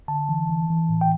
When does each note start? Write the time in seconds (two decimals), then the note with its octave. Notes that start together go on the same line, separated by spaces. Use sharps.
0.08 D3 A5
0.29 E3
0.49 E3
0.70 E3
0.89 A2
1.01 G5